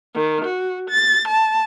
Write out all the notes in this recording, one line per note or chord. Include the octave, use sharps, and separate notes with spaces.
D#3
F#4
A6
A5